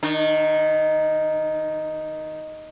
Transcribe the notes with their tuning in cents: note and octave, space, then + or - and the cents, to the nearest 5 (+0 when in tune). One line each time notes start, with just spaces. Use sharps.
D#3 +0 D4 +45